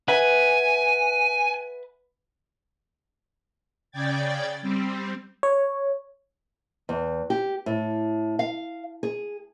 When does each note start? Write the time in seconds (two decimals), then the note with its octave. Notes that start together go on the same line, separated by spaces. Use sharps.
0.08 B4 E5 F#5 G#5
3.91 C#3 D5 G5 G#6 A6
4.61 G3 C4
5.43 C#5
6.89 E2
7.30 G4
7.66 A2
8.39 F5
9.03 G#4